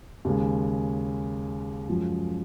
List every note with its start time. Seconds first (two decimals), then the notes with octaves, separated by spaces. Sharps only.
0.25 D#2 C#3 G#3
1.89 F#2 F3 G#3